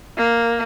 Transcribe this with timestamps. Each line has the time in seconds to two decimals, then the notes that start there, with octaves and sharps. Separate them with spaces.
0.18 A#3